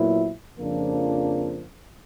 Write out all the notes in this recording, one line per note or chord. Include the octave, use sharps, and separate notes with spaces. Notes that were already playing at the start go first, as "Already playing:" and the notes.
Already playing: A#2 F#3 B3 E4
F2 C#3 F3 A#3 D4